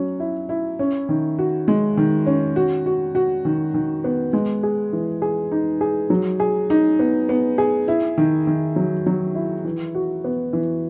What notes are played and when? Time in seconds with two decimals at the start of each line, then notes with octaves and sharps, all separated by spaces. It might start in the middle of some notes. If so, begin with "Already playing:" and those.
Already playing: F#3 C#4
0.20 E4
0.49 E4
0.79 C#4
1.09 D#3
1.38 F#4
1.68 G#3
1.97 D#3
2.26 C#4
2.56 F#4
2.86 F#4
3.15 F#4
3.45 D#3
3.74 D#3
4.04 B3
4.33 G#3
4.63 G#4
4.93 E3
5.22 G#4
5.51 D#4
5.81 G#4
6.10 F#3
6.40 G#4
6.70 D#4
6.99 B3
7.29 B3
7.58 G#4
7.88 E4
8.18 D#3
8.47 D#3
8.76 F#3
9.06 F#3
9.35 E4
9.64 E3
9.95 F#4
10.24 B3
10.53 E3